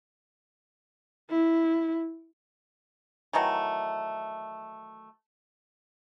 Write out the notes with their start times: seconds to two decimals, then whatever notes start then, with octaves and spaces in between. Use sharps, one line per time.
1.30 E4
3.33 D#3 E3 F#3 A3